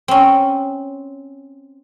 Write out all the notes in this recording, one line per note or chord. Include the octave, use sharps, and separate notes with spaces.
C4 C#4